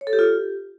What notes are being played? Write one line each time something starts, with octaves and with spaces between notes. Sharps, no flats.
C#5
A4
G4
F4
G4